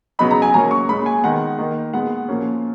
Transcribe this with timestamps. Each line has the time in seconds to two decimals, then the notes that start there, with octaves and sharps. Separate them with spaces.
0.19 C#3 F#3 B3 D#4 B5
0.31 A#5
0.42 G#5
0.54 C#3 F#3 A#3 C#4 A#5
0.71 C#6
0.89 A#2 G#3 C#4 B5
1.06 G#5
1.23 D#3 G#3 B3 F#5
1.58 D#3 A#3 D#4
1.93 A#2 G#3 B3 F#5
2.28 A#2 F3 A#3 C#4